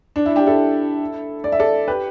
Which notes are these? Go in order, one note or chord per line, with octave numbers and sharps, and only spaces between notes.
D4
E4
D4 G4
E4 A4
D5
E5
A4 D5
G4 B4